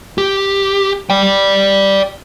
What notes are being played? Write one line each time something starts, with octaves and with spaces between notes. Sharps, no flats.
G4
D5 G5